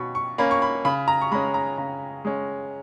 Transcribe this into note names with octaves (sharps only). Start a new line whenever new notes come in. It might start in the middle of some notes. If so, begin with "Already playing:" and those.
Already playing: B2 C#4 B5 C#6
C#6
A#3 C#4 B5
C#6
B5
C#3 B5
A#5
C#6
G#3 C#4 B5
A#5
C#3 A#5
G#3 C#4